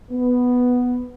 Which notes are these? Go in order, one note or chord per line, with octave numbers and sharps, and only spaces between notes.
B3